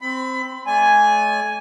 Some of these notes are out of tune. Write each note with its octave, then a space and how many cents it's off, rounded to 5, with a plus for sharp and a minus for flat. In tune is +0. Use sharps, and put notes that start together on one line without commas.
C4 +0 B5 +30
A3 -45 D5 -25 G#5 +0